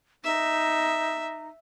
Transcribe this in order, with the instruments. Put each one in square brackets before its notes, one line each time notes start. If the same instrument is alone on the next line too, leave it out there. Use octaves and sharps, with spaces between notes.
[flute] D#4 [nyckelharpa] E5